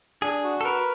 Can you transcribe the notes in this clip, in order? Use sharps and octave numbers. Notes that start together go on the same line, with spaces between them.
D4 G#4
F#4
A4
A#4 B4